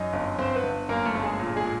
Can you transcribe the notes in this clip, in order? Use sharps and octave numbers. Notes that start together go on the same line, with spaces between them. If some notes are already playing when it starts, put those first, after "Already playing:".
Already playing: F#2 D#4 D#5
G1
G1 C4 C5
B3 B4
G1
F#2 A#3 A#4
A3 A4
G1
G#3 G#4
A#2
G#3 G#4
A#2